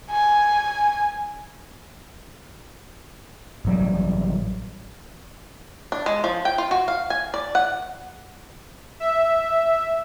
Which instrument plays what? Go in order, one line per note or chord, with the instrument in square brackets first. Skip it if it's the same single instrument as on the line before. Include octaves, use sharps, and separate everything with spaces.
[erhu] G#5
[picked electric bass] A1 F#3 G3
[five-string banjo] D4
G#3
F3
G5
F4
F#4
F5
G#5
D5
F#5
[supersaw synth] E5